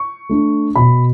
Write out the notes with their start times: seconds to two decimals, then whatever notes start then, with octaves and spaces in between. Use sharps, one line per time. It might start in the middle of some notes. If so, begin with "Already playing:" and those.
Already playing: C#6
0.29 A3 D4
0.76 B2 B5